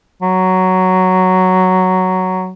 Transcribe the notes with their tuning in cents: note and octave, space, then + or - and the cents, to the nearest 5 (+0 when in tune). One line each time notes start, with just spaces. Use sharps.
F#3 +5